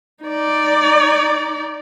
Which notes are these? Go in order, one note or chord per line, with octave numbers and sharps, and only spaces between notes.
D#4 D5